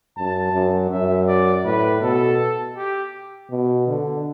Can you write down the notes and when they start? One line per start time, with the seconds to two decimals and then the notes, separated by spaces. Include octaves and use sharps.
0.17 F#2 A5
0.53 F#2
0.90 F#2 E5
1.27 D5
1.65 A2 B4
2.01 B2 A4
2.77 G4
3.51 B2
3.88 D3